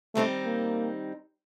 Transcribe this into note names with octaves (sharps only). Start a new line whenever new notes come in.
D#3 G3 A3 C4 D#4
A#3